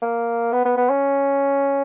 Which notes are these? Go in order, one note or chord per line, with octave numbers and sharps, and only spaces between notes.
A#3
B3
B3
B3
C#4